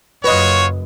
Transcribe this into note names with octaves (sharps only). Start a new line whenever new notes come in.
F#1 F#2 F4 F#4 B4 C#5 D#5